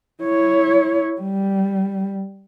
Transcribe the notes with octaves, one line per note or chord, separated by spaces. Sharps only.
E4 C#5
G3